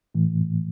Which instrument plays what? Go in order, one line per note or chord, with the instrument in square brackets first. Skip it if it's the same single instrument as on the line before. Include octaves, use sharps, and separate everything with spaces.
[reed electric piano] A2 E3 A3